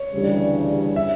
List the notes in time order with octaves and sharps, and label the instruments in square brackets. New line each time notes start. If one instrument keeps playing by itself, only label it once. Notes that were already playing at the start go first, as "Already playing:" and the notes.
Already playing: [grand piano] C#5
[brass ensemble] D2 C#3 E3 G3 D4
[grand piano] E5